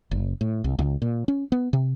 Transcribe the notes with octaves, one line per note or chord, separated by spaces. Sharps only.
F#1
A2
C2
C#2
A#2
C#4
B3
C3